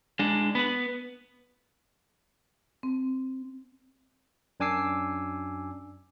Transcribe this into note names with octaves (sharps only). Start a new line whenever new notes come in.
G#3 D4
B3 B4
C4
F#2 D4 G#5 D6 E6 C7